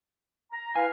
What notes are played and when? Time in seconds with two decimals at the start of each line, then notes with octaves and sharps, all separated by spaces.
0.52 A#5
0.76 E4 B4 F5 G#5